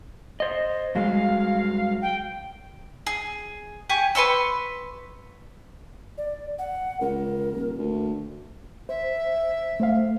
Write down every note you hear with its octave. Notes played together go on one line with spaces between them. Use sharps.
C5 D#5
G2 F#3 G#3 F5
G5
G#4
G4 G#5 C#6
B4 C6 C#6 E6
D5
F#5
C#2 A#4
D#1
D2
C5 E5
A3 C5 F5